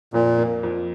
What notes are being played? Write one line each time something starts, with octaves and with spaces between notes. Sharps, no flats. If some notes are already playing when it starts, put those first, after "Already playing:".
F2 A#2
A#3
F2